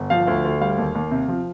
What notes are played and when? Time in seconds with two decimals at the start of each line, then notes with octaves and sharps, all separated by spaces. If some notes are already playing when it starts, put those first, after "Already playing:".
Already playing: G1
0.10 F3 F5
0.27 D2
0.45 D2
0.61 G3 F5
0.78 D#2
0.95 D#2
1.11 C3
1.28 F3